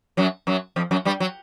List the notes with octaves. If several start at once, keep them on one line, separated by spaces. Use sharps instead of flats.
F#2 F#3
F#2 F#3
F2 F3
F#2 F#3
G2 G3
F#3